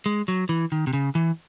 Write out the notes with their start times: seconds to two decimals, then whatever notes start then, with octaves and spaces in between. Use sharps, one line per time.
0.06 G#3
0.28 F#3
0.49 E3
0.72 D#3
0.87 C3
0.93 C#3
1.15 E3